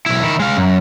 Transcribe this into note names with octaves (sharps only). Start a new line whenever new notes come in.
B1 E4
D#3 E4
G#3 F5
F#2